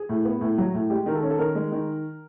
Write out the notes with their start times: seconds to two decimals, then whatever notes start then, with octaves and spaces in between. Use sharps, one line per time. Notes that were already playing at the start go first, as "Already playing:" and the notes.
Already playing: G#4
0.09 A2
0.25 B3
0.41 A2
0.58 F#3
0.74 A2
0.90 G#3 G4
1.06 D#3 A#4
1.15 A4
1.23 C#4
1.30 A4
1.39 D#3 A#4
1.55 G#3
1.72 D#3